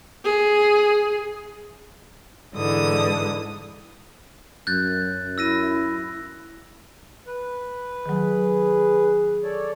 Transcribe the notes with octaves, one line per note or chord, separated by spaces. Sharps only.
G#4
G#2 D3 E3 D#6
F#2 F#6 G6 A6
E4 E6 A#6 D#7
B4
D#3 F#3 G#4
A4 C#5 D5